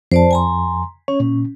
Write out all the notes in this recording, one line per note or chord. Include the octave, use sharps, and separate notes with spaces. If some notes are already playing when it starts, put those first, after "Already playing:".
F2 C5 D5 A5
G#5 A#5 C6
C#4 C#5
A#2